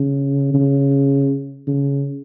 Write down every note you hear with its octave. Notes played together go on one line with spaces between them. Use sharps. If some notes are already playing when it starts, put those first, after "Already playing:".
Already playing: C#3
C#3
C#3